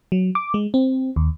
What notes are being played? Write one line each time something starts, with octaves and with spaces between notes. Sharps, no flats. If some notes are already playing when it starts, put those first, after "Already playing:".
F#3
D6
G#3
C4
D#2